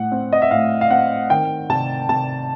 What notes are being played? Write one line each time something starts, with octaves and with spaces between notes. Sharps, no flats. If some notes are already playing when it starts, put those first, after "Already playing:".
Already playing: A2 F#5
C4
D#5
E5
A2 F5
F5
C4 F#5
D#3 G5
C3 A5
C3 A5